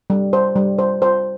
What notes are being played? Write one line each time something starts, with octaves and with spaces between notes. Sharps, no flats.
G3
C5
G3
C5
C5